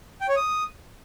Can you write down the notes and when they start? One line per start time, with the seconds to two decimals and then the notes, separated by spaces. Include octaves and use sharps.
0.21 G5
0.29 C#5
0.36 D#6